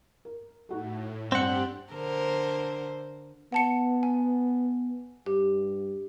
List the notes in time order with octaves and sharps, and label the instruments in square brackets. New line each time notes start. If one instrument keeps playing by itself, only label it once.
[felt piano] A#4
[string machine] A2 [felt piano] D#4 F#4 A4
[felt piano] G2 [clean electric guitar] C4 F#5 [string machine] D4 G4
[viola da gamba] D3 A#4 C5
[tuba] B3 [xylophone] F#5 A5 C#7
[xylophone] G#5
[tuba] G2 [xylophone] G4